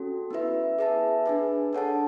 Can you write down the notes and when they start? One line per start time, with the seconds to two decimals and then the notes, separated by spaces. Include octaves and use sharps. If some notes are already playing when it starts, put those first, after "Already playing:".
Already playing: C#4 F#4 A4
0.31 B3 E4 B4 E5
0.79 G#4 B4 E5 A5
1.26 D4 G#4 B4
1.73 D4 A4 C#5 F#5 A5